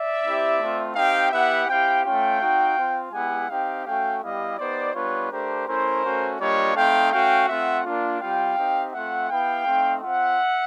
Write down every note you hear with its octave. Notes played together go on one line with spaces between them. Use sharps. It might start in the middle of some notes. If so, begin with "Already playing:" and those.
Already playing: D5 E5
C4 E4 G4
A3 C4 F4
C4 D#4 G4 F5 G5
B3 E4 G4 E5 F#5
C4 E4 G4 F5 G5
A3 C#4 F4 F5 G5
C4 D#4 F#4
C4 F4
G#3 B3 E4 G4 F#5 G#5
C4 D#4 G4 F5 G5
A3 C#4 F#4 F5 G5
G3 B3 E4 G4 D#5 F5
B3 D#4 G4 C5 D5
G3 B3 D4 F4 B4 C#5
A3 D4 G4 A#4 C5
A3 C#4 E4 A#4 C5
A3 C#4 F#4
G3 A#3 D4 F4 C#5 D#5
A3 C4 D#4 F5 G5
A3 C#4 F#4 F5 G5
A3 C4 F4 E5 F#5
A#3 D4 F4
G3 C4 F4 F5 G5
C4 D#4 G4
A3 C4 F4 E5 F#5
B3 E4 G4 F5 G5
A3 C4 D#4
C4 F4 E5 F#5